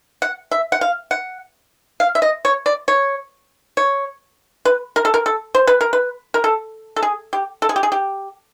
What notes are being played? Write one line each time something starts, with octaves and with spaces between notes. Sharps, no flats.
F#5
E5
F#5
F5
F#5
F5
E5
D#5
C#5
D5
C#5
C#5
B4
A#4
A4
A#4
A4
C5
B4
A#4
B4
A#4
A4
A4
G#4
G4
A4
G#4
G4
G#4
G4